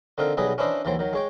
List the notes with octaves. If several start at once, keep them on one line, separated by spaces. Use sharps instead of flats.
D3 C4 D#4 F4 A#4
B1 F#3 G3 G#4 B4 D#5
C#4 D4 E4 B4 C5 D#5
D#2 E3 F#3 C5 G5
D#3 F#3
G#3 C#5 G5